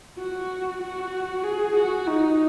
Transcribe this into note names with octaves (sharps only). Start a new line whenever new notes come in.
F#4
F#4
G#4
F#4
D#4